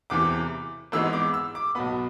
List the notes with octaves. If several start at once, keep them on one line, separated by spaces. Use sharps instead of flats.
E1 E2 C3 E3 D6
G#1 G#2 E3 G#3 B3 E6
D6
E6
D6
B1 B2 B3 B5